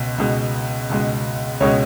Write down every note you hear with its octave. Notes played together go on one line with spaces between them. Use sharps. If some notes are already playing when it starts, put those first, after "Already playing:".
Already playing: C#2 B2
C#2 B2 G#3
C#2 B2 G#3
C#2 B2 G#3 C#5